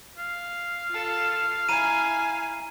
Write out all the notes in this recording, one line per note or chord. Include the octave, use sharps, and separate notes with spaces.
F5
F4 A4
E4 G#5 A#5 D#7